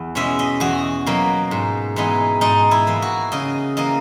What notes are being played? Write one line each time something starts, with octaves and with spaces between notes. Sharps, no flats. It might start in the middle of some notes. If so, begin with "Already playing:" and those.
Already playing: E2
B2 G#3 C#4 E5
D#5
E2 F#4
B2 F#3 A#3
G#2
E3 G#3 B3 D#4
G#2 D#4
E4
E3 A#3
F#4
C#3 D#5
E3 A#3 D#5